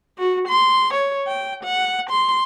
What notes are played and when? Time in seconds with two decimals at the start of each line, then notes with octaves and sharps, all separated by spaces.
0.18 F#4
0.48 C6
0.94 C#5
1.27 G5
1.64 F#5
2.10 C6